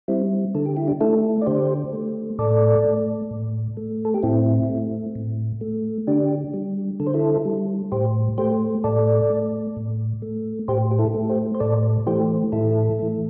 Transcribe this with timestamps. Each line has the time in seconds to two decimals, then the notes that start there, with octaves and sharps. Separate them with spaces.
0.08 G3 C4 E4
0.55 D3 A4
0.66 G4
0.77 E4
0.88 D4 G4
1.01 A3 E4 A4
1.42 D5
1.46 D3 G4 C5
1.93 A3
2.39 A2 A4 D5
2.84 A3
3.31 A2
3.77 A3
4.05 A4
4.14 G4
4.23 A2 C4 E4
4.69 A3
5.15 A2
5.61 A3
6.07 D3 D4 G4
6.54 G3
7.00 D3 A4
7.07 C5
7.14 E4 A4
7.45 G3
7.92 A2 G4 C5
8.38 A3 G4 C5
8.84 A2 A4 D5
9.30 A3
9.76 A2
10.22 A3
10.68 A2 G4 C5
10.91 G4
10.99 E4 A4
11.14 A3
11.29 G4 C5
11.55 C5
11.60 A2 A4 D5
12.06 E3 A3 G4 C5
12.52 A2 E4 A4
12.99 E3 A3